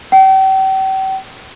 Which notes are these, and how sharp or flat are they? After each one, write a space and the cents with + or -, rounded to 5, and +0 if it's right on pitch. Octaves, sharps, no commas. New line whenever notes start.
G5 -40